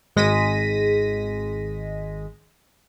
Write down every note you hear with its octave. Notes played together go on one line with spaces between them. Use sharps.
G#1 G#3 A#6 B6 D#7